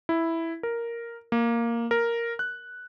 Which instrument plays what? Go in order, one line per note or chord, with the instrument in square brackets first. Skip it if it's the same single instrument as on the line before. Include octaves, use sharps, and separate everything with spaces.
[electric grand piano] E4
A#4
A#3
A#4
F#6